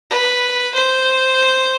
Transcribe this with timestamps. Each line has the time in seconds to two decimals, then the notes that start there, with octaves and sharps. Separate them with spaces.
0.11 B4
0.75 C5